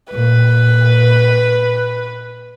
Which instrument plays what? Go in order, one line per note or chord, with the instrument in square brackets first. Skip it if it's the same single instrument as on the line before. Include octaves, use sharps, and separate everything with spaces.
[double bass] A#2 [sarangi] B4